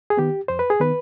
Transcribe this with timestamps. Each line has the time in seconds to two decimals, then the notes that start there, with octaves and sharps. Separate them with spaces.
0.10 G#4
0.17 D#3 B3 G4
0.48 F2 C5
0.59 B4
0.70 G#4
0.80 D#3 B3 B4